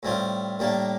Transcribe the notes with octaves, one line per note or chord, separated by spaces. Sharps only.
A2 G3 C4 F4
A2 G3 A#3 D4